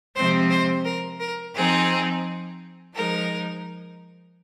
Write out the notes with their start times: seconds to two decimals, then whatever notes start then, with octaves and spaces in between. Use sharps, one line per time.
0.15 C3 F3 G#3 C4 C5
0.50 C5
0.85 A#4
1.20 A#4
1.55 F3 C4 D#4 G#4
2.95 F3 G#3 D#4 A#4